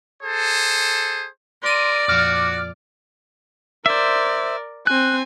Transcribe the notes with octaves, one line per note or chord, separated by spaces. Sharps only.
G#4 A4 C5
A#4 D5 C6 D#7
F2 A#2 F3 F#4 D6 F6
A#4 C5 D5 E5
C4 G#5 F#6